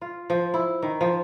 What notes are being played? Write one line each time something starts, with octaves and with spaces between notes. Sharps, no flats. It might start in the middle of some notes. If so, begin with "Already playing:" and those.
F4
F3
E4
D#3
F3